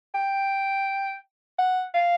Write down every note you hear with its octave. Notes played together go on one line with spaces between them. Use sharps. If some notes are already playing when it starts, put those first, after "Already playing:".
G5
F#5
F5